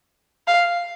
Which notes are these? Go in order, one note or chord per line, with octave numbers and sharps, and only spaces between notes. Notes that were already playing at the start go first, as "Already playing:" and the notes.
F5